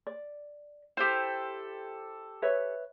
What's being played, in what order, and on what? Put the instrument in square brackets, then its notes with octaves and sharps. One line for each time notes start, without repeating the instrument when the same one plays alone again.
[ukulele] D5
[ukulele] E4 [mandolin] G4 A4 C5
[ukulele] B4 C#5 E5